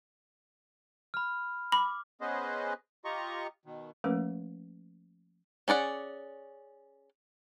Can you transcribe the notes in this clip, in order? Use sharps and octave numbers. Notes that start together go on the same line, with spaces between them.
B5 F6
B5 D6
B3 C#4 G#4 B4 C5 D#5
F4 G4 D#5 A#5 C#6
B2 D#3
F3 A3 A#3 C#4 A#4 B4
C#4 G#4 D5 F#5